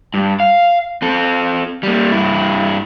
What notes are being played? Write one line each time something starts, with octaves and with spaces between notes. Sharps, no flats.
G2
F5
C4 A4
G3 A#3
G2 E4